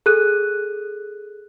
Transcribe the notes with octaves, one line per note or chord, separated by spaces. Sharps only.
G#4 A4 F#6 D#7